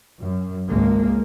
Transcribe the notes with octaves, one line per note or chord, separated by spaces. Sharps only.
F#2
G#1 C#2 G#3 A#3